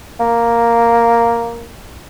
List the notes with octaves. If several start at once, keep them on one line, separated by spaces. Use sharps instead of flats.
A#3